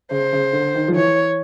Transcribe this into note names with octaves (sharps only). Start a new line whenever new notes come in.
C#3 C5
C#3
D3
D#3
F3
E3 C#5